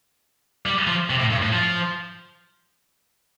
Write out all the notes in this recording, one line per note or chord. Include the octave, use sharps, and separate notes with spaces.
G3
F3
C3
A2
G2
A2
F3